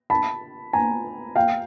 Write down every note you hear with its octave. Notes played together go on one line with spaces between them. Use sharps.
A5 B5
G#5 A#5
F5 G5